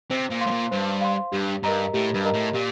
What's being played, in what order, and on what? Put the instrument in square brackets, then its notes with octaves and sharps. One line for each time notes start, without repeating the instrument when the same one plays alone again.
[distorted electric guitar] C3 [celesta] C5
[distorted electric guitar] A#2
[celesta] F5 C6
[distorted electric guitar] A2
A#2
[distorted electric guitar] G2 [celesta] C5
[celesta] F5 C6
[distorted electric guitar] G2 [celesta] G4
[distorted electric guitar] G2 [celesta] A#4 D#5 A#5
[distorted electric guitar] A2 [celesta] G4
[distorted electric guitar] G2
[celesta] A#4 D#5 A#5
[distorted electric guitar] A2
[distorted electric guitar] A#2 [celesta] G4